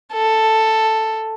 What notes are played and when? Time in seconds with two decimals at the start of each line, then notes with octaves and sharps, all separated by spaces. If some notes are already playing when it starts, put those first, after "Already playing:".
0.13 A4